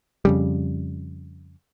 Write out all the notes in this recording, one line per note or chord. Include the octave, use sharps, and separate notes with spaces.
F2 C#3 G3